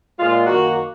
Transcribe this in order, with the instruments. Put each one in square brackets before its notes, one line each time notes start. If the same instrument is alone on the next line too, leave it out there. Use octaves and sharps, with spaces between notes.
[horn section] A#2 G#3 F4
F#2 D#3 A#3 F#4